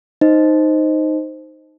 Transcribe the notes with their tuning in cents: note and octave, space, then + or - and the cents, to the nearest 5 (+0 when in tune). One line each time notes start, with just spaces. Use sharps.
D#4 +0 C5 +0 D#5 +0